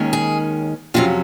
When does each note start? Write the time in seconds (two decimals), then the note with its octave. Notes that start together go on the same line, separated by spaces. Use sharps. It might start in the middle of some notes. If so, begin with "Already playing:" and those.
Already playing: D#2 D#3 G#3 C#4
0.13 G#4
0.94 F2 C3 F#3 C#4 F4